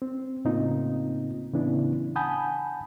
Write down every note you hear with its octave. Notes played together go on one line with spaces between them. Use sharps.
C4
A2 C#3 A#3 C4 D#4 F4
A2 C#3 E3 B3 D4 E4
F#5 G#5 A5 B5 D#6 G6